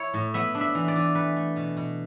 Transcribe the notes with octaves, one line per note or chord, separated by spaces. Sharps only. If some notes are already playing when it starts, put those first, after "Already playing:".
Already playing: E4 C#5
A2
B3 E5
D4
E5
E3
D5
E3
A3 B4
A3
B2
B2